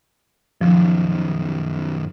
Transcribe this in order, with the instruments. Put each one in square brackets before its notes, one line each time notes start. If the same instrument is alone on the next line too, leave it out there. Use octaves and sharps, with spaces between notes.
[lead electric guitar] F#2 D#3 [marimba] F3